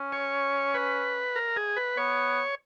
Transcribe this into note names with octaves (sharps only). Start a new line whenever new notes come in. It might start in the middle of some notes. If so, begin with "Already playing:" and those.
Already playing: C#4
C#5
B4
A#4
G#4
B4
B3 C#5